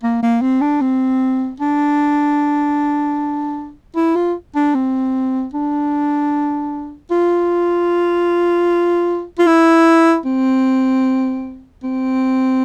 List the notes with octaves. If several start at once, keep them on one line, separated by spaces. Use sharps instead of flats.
A#3
A#3
C4
D4
C4
D4
E4
F4
D4
C4
D4
F4
F4
E4
C4
C4